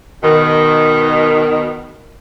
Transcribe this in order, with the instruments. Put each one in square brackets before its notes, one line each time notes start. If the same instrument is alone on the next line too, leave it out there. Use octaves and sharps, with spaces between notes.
[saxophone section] B2 D#3